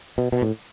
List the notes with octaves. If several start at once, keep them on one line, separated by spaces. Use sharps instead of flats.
B2
B2
A2